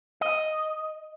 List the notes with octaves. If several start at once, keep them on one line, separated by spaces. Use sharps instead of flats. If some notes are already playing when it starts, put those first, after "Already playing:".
D#5